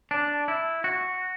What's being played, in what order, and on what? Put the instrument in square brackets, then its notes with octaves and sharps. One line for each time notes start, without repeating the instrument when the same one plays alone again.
[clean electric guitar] D4
E4
F#4